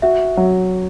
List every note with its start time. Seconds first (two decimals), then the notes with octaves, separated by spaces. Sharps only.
0.02 F#4 E5
0.37 F#3